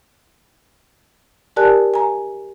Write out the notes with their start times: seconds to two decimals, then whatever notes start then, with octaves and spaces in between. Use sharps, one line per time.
1.56 G4 A#4 D5 G#5 A5 F#6
1.94 G#5 A#5